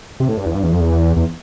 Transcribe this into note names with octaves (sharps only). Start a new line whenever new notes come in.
C3
A2
G2
E2
G2
E2
F2
E2
E2